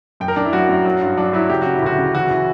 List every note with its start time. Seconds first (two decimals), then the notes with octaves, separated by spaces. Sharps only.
0.20 F#2 G5
0.28 A#4
0.36 F#2 D4
0.45 E4
0.53 F#2 F#4
0.69 F#2
0.85 F#3
1.01 G2
1.17 F#3 D4
1.33 F#3 E4
1.49 C#3 G4
1.62 C#3 F#4
1.75 E4
1.82 D2 F#4
1.99 C#3
2.14 E3 F#4
2.31 E3